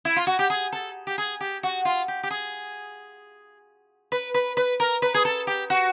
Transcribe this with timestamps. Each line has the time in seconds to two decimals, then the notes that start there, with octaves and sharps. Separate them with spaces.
0.05 E4
0.16 F4
0.27 F#4
0.39 G4
0.50 G#4
0.73 A4
1.07 G4
1.18 G#4
1.41 G4
1.63 F#4
1.85 F4
2.08 G4
2.23 G4
2.30 G#4
4.12 B4
4.34 B4
4.57 B4
4.80 A#4
5.02 B4
5.14 G#4
5.25 A4
5.47 G4
5.70 F#4